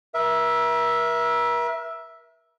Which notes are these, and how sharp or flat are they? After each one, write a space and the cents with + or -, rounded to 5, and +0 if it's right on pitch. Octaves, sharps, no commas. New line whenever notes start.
A#4 +40 E5 +0